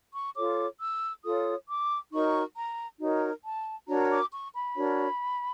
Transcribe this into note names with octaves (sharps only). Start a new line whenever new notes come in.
C#6
F4 A4 C#5 D6
E6
F4 A4 C#5 D#6
D6
D#4 F#4 A#4 C#5 C#6
A#5
D#4 F#4 A#4 C#5
A5
D4 F#4 A#4 C#5 A#5
D6
C#6
B5
D4 F#4 A#4 C#5